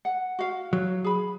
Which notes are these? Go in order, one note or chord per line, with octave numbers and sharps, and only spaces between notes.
F#5
F#4 F5
F#3
G#4 B5